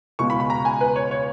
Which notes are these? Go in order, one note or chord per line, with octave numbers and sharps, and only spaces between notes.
C#2 B2 G#3 C#6
B5
B5
A#5
G#5
B4
C#5
C#5